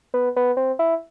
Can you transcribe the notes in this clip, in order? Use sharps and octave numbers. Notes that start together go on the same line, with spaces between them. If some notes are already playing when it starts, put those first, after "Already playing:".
B3
B3
C4
E4